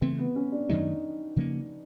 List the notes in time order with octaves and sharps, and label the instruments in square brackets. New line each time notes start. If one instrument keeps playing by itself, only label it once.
[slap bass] C#3 E3 A3 [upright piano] C4
[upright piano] B3
C#4
D4
[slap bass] F#2 D#3 F#3 A3 [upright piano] D#4
[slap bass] C#3 F3 A#3 C#4